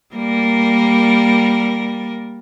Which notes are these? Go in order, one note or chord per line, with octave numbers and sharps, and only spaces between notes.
G3 A#3 A#4